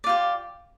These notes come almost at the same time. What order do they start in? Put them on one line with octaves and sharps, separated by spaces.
D5 F4 G4